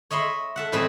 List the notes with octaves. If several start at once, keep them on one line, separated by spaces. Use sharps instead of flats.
C#5 D#5 E5 B5 C6
A4 E5 F#5
A2 E3 G3 C4 D#5 G#5